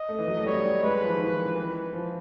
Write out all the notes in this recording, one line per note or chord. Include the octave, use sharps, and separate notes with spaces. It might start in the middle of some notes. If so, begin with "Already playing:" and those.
Already playing: D#5
A3
E3
F#3
A3
G3 C#5
G3
G#3 B4
F3
E3
D#3
E3
E3
F3